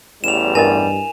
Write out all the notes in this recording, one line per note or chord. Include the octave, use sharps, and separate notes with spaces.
A1 E2 G3 E7 F7
G2 E4 A#4 D#5 G#5